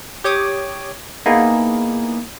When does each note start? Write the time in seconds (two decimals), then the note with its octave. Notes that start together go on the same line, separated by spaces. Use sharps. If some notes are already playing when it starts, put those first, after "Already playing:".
0.24 G4 C#5 D6 D#6
1.26 A#3 B3 D#4 E4 G#4